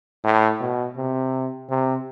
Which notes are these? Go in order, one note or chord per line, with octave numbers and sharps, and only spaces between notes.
A2
B2
C3
C3